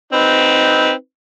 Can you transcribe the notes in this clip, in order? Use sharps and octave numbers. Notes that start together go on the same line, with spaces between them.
C4 D#4 B4